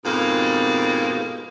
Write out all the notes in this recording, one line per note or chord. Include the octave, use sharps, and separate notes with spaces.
F2 G#2 B2 A#3